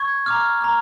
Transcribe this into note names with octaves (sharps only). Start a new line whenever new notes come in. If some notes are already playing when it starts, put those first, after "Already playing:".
Already playing: C#6 G#6
A#5 D6 F6
A#5 D6 F6